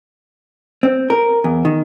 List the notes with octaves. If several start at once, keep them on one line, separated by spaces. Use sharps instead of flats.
C4
A#4
E2
D#3